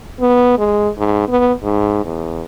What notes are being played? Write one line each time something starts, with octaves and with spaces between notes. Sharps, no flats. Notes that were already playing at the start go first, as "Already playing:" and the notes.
B3
G#3
G#2
B3
G#2
E2